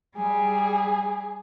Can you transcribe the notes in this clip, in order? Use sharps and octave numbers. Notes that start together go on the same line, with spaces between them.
G3 G#4